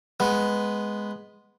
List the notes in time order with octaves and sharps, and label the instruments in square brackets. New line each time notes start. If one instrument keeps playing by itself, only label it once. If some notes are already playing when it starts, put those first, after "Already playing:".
[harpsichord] G#3 B3